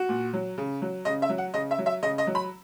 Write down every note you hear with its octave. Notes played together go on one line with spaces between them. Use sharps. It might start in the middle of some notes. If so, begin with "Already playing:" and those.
Already playing: F#4
A#2
F#3
C#3
F#3
C#3 D#5
E5
F#3
F#5
C#3 D#5
E5
F#3
E5
C#3 D#5
D#5
F#3
B5